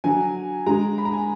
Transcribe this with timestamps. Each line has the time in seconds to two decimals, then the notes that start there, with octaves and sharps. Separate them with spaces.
0.04 D3 F#3 G#5
0.66 D3 G#3 A#5
0.98 B5
1.05 A#5
1.13 G#5